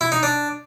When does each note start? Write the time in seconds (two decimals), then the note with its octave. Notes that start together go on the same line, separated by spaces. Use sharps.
0.01 E4
0.12 D#4
0.23 D4